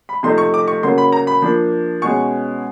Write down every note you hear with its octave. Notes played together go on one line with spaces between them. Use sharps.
B5
C3 F3 A3 C4 D#4 C6
C#6
D6
C#6
C#3 F#3 A#3 C6
B5
A#5
B5
F3 A#3 D4
B2 G#3 C#4 C#6